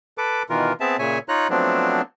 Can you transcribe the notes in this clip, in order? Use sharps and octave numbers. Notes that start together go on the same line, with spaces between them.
A4 B4 D6
B2 D#3 E3 F4 A#4
B3 C4 G#4 E5 A5
A#2 C#3 C#5 E5 G#5
D#4 F4 C#5 A#5 F#6
F3 F#3 A3 B3 C4 D4